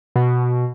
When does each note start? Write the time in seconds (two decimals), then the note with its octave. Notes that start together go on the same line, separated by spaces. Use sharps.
0.16 B2